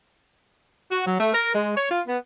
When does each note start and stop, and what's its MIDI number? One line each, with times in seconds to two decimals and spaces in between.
0.92 1.04 66
1.06 1.18 54
1.20 1.31 57
1.33 1.52 70
1.55 1.73 56
1.76 1.89 73
1.91 2.01 65
2.07 2.17 59